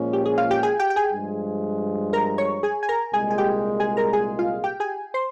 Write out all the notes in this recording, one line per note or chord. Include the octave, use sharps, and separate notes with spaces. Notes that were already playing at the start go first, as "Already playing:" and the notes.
Already playing: A#2 F3 G#3 C#4
G4
G#4
F4 F5
G4 G5
G#4 G#5
G4 G5
G5
G#4 G#5
G2 F3 G#3
A#4 A#5
C#5 C#6
G#4 G#5
G#5
A#4 A#5
C2 A#2 G#3 G#4 G#5
G#5
G4 G5
G#4 G#5
A#4 A#5
G#4 G#5
F4 F5
G4 G5
G#4 G#5
C5 C6